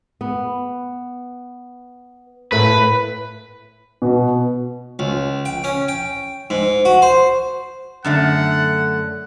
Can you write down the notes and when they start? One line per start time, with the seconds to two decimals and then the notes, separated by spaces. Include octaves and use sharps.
0.21 B3
2.52 A2 A3 A#3 B4
4.02 B2
4.99 C#2
5.45 G5
5.64 C#4
5.88 G5
6.50 G#2
6.85 F#4
7.02 C5
8.05 F#2 D3 A3 F#5